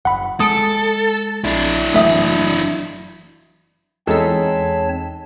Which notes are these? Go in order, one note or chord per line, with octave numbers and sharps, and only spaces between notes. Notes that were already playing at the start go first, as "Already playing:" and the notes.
F#1 F#5 B5
G#3 A4 D#6 D7
A#1 D4 E4
F#1 E3 F#3 A3 E5 D#6
E2 G#3 C4 D#4 A4 C#5 A5 B6